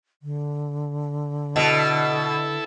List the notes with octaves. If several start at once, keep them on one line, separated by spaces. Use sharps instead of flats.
D3
B2 E4 A4 D#5